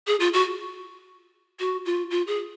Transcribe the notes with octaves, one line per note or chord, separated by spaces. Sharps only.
G#4
F4
F#4
F#4
F4
F4
G#4